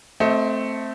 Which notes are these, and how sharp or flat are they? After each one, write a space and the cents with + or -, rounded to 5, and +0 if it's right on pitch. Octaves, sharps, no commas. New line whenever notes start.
A3 +0 C4 +0 D#5 +30